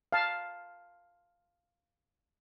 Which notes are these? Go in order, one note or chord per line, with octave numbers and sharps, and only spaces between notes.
F5 A5